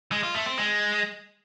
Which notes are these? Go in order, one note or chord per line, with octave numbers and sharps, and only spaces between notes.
G#3
F4
A3
C4
G#3